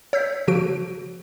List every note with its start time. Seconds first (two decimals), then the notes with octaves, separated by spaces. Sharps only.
0.13 C#5 E6 G6 B6
0.48 C#3 F3 F#4 D7